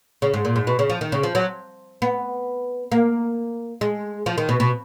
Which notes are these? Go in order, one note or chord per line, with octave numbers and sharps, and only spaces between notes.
C#3
G#2
A#2
G#2
B2
C#3
F3
D#3
C#3
F3
F#3
B3
A#3
G#3
F3
D#3
B2
B2